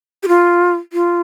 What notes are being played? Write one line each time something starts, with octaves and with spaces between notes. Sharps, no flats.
G4
F4
F4